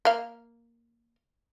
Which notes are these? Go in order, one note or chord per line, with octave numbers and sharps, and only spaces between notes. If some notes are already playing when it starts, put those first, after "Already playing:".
A#3 F5